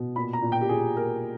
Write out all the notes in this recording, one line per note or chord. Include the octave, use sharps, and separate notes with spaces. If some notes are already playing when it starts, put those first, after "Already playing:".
Already playing: B2
A#2 B5
A#5
A#2
G5
G4
A#2 G#4
A#2 A#4